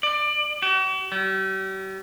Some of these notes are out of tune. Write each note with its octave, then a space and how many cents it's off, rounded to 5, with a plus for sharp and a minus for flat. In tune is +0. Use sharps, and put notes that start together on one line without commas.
D5 +25
F#4 +45
G3 -40